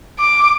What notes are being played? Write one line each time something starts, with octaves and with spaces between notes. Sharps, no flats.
D6